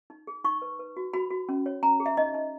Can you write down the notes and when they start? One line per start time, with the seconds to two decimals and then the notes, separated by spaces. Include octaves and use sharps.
0.10 D#4
0.27 G#4
0.44 D#4 C#6
0.62 B4
0.79 B4
0.97 F#4
1.13 F#4 B5
1.31 F#4
1.49 C#4
1.66 C#5
1.83 C#4 A#5
2.00 G#4
2.06 E5
2.17 D#4 D#5
2.34 D#4